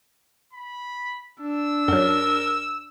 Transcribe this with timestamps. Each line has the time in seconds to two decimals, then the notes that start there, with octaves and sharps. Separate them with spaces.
0.53 B5
1.40 D4 E6
1.88 F#2 F#3 A#4